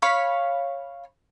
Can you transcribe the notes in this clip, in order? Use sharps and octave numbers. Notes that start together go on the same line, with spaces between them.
C#5 F5 B5